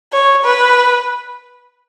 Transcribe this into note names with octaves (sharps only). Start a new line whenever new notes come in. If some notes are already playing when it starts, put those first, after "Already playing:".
C#5
B4